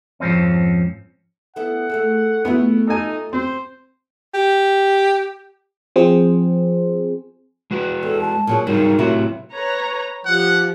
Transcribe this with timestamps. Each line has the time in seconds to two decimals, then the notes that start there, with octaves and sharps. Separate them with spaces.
0.20 F2 G#2 F3 C4 C#4
1.56 B3 E4 A4 F#5
1.90 A3 G#4 A4
2.45 A3 B3 E4 F4 G#4
2.87 D#4 A4 G#5
3.33 C4 C5
4.34 G4
5.96 F3 C4 G#4 C5
7.71 G#3 F#4 B4
8.03 E2 A4
8.21 A5
8.47 A#2 F#3 G#4
8.67 G#2 F#3 G3 D#4 A#4
8.99 A2 C3 F#3 E4 F#4
9.53 B4 C#5 A#5
10.26 F3 G4 F#5